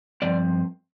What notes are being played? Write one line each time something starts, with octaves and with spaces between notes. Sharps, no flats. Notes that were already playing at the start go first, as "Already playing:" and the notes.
G2 F3 C4 D5